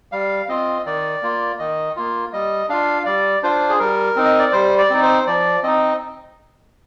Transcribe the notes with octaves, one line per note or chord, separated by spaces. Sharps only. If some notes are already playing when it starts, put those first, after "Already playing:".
G3 F5
C4 F4 D#5
D#3 D5
A#3 F4
D#3 D#5
A#3 F4
G3 D#5
D4 F4 F5
G3 D5
D4 F4 C5
G#4
G3 A#4
C4 D#4
D#5
D5
G3 C5
D5
C4 D#4
C5
F3 D5
C4 D#4 D#5